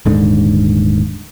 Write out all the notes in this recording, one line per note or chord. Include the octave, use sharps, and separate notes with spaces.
D#1 G#2 D3